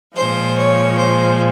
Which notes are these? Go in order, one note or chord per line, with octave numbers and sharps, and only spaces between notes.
A#2 F3 G#3 C5
C#5
C5